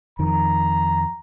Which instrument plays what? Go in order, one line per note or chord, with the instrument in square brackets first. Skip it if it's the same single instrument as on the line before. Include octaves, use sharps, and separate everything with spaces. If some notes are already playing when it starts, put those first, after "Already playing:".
[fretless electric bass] F2 D#3 [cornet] A#5